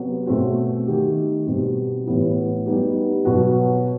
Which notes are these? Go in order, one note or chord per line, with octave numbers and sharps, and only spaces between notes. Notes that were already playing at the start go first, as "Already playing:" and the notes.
Already playing: C3 F#3 B3
B2 A3 C4 F#4
D#3 A3 D#4 G4
B2 G3 C4 F#4
A2 E3 B3 E4 G4
G3 B3 D#4 G4
B2 F#3 B3 F#4